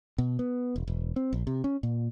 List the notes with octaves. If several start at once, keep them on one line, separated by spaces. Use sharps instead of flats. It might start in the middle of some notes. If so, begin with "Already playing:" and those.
B2
B3
E1
E1
C4
A#1
C3
C#4
A#2